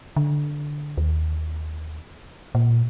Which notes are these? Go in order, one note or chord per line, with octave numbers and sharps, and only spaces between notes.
D3
D#2
A#2